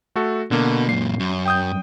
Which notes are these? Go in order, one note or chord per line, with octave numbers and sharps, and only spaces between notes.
A3 F#4 A4
B2 D3 A#3
F#2 A#2 C7
F#2
G5 D#6 G6